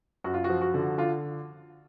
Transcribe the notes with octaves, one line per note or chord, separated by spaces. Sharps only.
F#2 F#4
F4
F#4
F3
F#4
D3
D3 F4